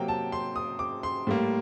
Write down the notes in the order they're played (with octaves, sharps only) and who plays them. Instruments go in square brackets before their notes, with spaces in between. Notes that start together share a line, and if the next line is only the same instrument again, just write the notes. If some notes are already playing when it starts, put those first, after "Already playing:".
Already playing: [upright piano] C3 F#3 A#3 G5
A5
C6
D#6
D6
C6
A2 G3 A#3